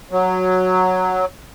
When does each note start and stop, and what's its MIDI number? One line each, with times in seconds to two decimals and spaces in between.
0.11 1.25 54